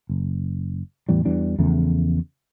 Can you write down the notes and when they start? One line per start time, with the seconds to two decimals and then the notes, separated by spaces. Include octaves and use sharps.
0.09 F#1
1.09 E2 A2 E3 G3
1.25 E2 E3 G3 D4
1.59 E2 C#3 F3 A3